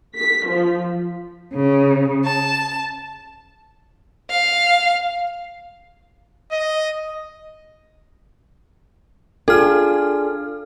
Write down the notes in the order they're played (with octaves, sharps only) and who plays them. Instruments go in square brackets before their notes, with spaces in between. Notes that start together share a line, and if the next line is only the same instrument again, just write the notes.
[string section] B6
F3
[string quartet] C#3
A5
[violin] F5
[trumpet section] D#5
[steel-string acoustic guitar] D4 F4 G#4 [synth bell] A4 F6